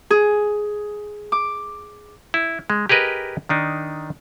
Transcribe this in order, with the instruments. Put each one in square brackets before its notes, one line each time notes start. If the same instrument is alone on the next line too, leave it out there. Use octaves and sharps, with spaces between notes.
[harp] G#4
D6
[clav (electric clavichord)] E4
G#3
G4 G#4 A#4 B4 D#5
D#3 D4 D#4